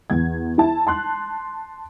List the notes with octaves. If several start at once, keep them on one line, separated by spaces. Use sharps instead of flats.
E2 G#6
E4 A5
A5 C6 F#6